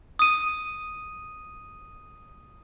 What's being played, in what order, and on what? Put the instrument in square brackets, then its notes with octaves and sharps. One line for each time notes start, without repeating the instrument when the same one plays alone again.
[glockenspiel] D#6 D#7